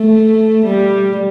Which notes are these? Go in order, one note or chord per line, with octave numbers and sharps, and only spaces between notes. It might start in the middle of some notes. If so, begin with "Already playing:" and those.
Already playing: A3
G3